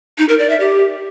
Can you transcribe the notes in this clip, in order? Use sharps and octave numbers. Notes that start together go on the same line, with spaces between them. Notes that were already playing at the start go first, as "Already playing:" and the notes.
D#4
A#4
D5
E5
G4